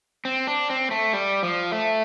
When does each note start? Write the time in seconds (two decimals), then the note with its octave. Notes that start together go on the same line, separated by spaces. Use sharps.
0.25 C4
0.47 D4
0.70 C4
0.91 A3
1.13 G3
1.43 F3
1.72 A3